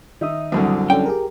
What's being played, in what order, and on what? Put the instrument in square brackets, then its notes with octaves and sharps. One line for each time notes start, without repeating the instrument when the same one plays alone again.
[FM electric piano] D#3 E5 D#6 [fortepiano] D#4
[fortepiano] C2 F#2 D3
[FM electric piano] C#4 D4 A4 [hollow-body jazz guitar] G5
[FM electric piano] G4 G#4 A#4